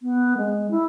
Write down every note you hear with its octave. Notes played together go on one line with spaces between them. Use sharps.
B3
G#3
E4